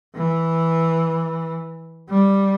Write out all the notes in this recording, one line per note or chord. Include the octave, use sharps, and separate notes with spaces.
E3
G3